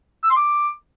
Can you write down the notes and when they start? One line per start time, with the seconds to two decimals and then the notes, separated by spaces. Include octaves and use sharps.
0.23 E6
0.30 C6
0.37 D6